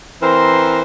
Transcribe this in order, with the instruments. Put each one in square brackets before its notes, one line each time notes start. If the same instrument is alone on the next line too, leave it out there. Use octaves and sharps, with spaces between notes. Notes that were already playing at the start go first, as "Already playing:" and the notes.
[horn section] E3 C4 A#4 C5 A#5 C6